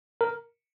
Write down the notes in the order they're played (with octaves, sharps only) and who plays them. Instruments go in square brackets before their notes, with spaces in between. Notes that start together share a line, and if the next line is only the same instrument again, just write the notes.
[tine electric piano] A#4